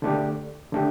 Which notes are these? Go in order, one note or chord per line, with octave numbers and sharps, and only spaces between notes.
D3 A3 D4 G4
D3 A3 D4 G4